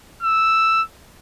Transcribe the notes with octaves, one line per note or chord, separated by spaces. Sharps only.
E6